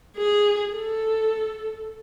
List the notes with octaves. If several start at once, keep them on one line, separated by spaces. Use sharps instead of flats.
G#4
A4